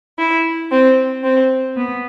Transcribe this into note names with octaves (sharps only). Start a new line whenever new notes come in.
E4
C4
C4
B3